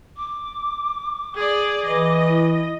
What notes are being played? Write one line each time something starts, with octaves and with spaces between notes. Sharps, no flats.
D6
G#4 D5
E3 D#5 D6
E4